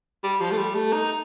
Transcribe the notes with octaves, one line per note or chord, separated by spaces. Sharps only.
G3
F3
A3
G3
A3
D#4